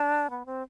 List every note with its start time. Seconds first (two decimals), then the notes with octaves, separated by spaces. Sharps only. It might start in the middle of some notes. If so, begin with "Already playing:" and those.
Already playing: D4
0.30 B3
0.46 C4